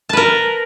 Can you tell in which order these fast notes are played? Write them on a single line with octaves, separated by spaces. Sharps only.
A5 B4 A#4